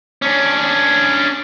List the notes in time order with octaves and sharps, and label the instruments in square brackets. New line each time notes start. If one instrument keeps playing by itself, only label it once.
[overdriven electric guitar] C#4 D4